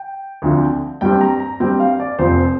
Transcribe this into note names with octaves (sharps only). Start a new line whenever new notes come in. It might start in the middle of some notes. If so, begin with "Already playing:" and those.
Already playing: G5
D2 D3 F3 C4
G2 G3 C4 G5
A#5
A#5
G2 G3 C4 G5
F5
D5
F1 F2 F3 C4 C5